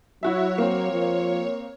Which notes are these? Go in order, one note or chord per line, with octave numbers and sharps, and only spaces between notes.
F#3 E4 F#4 C#5 E5
A#3 C4
F3